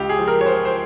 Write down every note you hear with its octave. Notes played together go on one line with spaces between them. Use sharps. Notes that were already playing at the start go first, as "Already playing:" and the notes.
Already playing: C#2 G4
G#4
F3
A#4
C#5
C#2 C5
C5